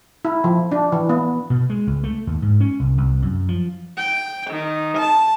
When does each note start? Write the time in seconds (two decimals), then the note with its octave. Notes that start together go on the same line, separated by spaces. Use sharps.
0.25 E4
0.44 F3
0.72 D4
0.92 E3
1.09 B3
1.50 B2
1.70 G#3
1.87 C#2
2.04 A3
2.27 D#2
2.42 G#2
2.60 C#4
2.80 C2
2.98 C2
3.22 F#2
3.48 F3
3.98 G5
4.50 D#3
4.99 A5